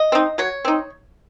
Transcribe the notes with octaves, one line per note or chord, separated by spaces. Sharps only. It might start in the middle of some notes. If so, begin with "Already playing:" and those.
Already playing: D#5
C4 D#4
F#3 C#5
C4 D#4